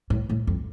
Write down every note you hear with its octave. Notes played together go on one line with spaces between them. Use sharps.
A2
A2
F2